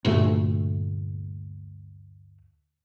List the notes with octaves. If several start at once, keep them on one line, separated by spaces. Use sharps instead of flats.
D2 G2 A#2 A3